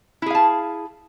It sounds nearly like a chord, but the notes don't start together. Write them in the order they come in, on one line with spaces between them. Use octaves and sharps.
E4 G#4 F5 A5